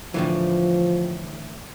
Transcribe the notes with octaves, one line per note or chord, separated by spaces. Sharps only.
A2 D3 E3 F3